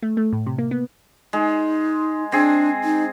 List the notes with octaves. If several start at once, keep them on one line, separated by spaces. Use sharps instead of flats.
A3
A3
A2
C3
A#3
B3
G#3 D#4
C4 D4 G#4
D#4